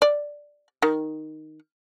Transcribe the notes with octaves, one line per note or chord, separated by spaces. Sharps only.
D5
D#3